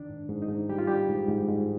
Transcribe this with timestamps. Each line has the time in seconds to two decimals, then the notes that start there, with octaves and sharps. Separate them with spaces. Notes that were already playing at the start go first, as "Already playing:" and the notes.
Already playing: D#3 D4
0.10 G#2
0.29 G#2
0.42 D#4
0.49 G#2
0.69 G3 G4
0.79 F4
0.88 G3 G4
1.09 G#2
1.29 G#2
1.48 G#2